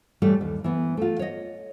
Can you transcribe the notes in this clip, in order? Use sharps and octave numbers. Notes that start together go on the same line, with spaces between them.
A2 E3 G3 A3
D#2
E3 B3
A3 F4
C#5 D#5